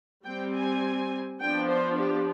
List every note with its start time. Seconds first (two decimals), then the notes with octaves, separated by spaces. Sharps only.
0.24 G3 C4 G5
0.54 G#5
1.40 F3 B3 D4 G5
1.68 C5
1.98 G4